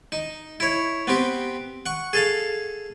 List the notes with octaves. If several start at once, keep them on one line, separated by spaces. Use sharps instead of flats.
D#4
E4 C#5
B3 C4 G4
F#5 C#6
G#4 A4 F5